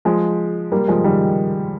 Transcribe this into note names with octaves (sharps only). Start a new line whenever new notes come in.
F3 G#3
G3 A#3
F3 G#3
D#3 G3